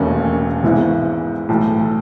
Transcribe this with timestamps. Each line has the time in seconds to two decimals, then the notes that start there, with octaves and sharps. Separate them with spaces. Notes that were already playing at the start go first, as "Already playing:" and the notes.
Already playing: E1 D#2 D#3 A3 C#4
0.63 G#1 G#2 E3 B3 E4
1.49 B1 A2 E3 A3